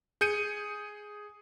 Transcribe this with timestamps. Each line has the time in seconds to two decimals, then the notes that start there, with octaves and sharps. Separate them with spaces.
0.21 G#4 G6 C#7 D#7